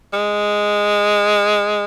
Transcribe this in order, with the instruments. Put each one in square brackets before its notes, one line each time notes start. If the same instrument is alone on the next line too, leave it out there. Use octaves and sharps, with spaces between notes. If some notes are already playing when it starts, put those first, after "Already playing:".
[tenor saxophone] G#3